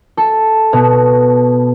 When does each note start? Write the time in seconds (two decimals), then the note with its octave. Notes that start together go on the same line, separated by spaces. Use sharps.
0.17 A4
0.73 B2